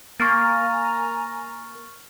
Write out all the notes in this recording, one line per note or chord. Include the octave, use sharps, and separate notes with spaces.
A#3 G#5 A#5 C#6 F6 A6